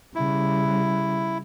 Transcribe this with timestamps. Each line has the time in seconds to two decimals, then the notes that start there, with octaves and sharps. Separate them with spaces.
0.15 C#3 G3 E4